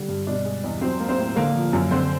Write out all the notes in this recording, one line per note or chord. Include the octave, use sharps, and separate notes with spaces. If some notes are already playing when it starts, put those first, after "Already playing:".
Already playing: D3 G3
G2
B2 D4 D5
G#3
E2
F#3 C4 C5
A#3
C4 C5
A2
D3 A#3 A#4
F3
F#2
D3 C4 C5